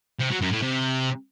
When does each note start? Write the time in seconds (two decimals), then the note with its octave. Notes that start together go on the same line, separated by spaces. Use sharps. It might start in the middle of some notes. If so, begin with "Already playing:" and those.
0.19 C3
0.30 F#3
0.41 F#2
0.51 A2
0.62 C3